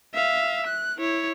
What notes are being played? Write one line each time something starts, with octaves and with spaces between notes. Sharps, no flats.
E5 F5
F#6
E4 C#5